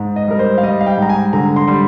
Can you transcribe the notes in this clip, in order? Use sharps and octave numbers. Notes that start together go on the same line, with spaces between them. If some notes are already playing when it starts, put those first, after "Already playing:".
Already playing: G#2
D#5
G3 A#4
C5
F5
G3 D#5
F5
G5
G#2 A#5
G#5
D3 A#5
C6
G3